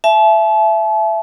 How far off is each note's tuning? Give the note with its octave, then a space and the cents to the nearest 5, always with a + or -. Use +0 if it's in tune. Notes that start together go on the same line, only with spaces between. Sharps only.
E5 +20 A5 -40